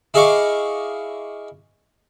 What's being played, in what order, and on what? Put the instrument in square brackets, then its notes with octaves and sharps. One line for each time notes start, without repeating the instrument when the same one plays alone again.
[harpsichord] E4 G#4 D#5 F5 C#6 D6